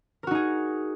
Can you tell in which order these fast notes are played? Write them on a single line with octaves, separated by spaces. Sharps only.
A#4 F#4 D#4 G#4